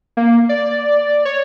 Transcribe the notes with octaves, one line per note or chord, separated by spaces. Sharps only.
A#3
D5
C#5